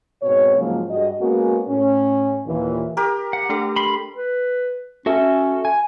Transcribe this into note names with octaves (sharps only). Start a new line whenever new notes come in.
G#2 B2 C4 C#5
G#2 C#3 F3 F#3 G#3 A#3
G2 F#4 G#4 D#5
G#3 A#3 B3 C#4 F#4
A2 C#4
D#2 A#2 E3
G4 A#4
F#5
A3 D4 A4
B5 C6
B4
C#4 F#4 A4 E5
G#5